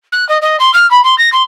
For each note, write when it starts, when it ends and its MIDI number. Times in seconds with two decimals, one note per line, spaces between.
0.12 0.27 90
0.29 0.38 75
0.42 0.57 75
0.60 0.73 84
0.74 0.89 89
0.91 1.01 83
1.04 1.17 84
1.18 1.30 94
1.32 1.42 84